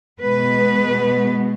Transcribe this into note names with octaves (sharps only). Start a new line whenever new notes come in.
B2 G#3 B3 B4